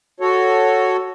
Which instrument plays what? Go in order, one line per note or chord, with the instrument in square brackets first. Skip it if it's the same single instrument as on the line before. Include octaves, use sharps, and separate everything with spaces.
[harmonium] F#4 A4 C#5